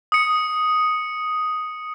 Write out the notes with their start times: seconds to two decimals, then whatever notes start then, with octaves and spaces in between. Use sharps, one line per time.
0.12 D#6 C#7